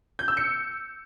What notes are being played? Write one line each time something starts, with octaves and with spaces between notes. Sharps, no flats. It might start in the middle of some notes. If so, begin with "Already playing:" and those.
G6
E6
C#7